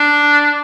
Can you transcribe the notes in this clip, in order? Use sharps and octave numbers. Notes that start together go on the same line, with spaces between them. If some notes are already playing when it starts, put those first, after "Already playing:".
Already playing: D4